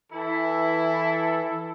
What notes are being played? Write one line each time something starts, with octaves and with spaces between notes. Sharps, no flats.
E3 E4 A4